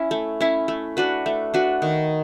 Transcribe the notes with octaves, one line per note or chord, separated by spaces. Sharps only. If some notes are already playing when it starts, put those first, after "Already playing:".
Already playing: C#4 E4
A3
C#4 E4
A3
D4 F#4 B4
A3
D4 F#4 B4
D#3